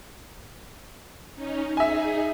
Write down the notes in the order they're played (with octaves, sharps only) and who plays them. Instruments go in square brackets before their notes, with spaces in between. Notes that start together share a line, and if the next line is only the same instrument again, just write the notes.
[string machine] C#4 D#4
[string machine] D#4 G#4 [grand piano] E5 G#5